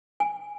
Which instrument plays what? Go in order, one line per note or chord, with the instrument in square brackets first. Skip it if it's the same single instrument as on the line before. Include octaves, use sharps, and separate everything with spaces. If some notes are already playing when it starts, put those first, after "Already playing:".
[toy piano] G#5